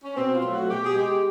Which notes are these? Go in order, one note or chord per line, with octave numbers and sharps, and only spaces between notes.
C#4
B2 C4
F4
F#3 A3
F#4
B2 G4
G#4
G#3 G4